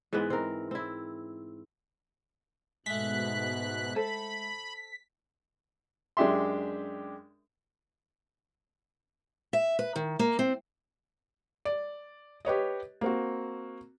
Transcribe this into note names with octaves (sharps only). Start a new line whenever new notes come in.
G#2 E3 G#3 B3
C4 A#4
C4 E4
G#2 B2 G#3 A3 F#6 B6
A4 C5 B5
F#2 G#3 D4 G4 E5 C6
E5
B4
D#3
A#3
C4
D5
G4 B4 C#5 D#5
A#3 C4 F#4